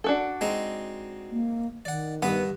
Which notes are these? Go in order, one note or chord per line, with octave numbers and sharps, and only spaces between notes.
D4 F#4 A4
G#3 C4 D#4
A#3
D#3 D5 F#5
G2 B3 F#5 B5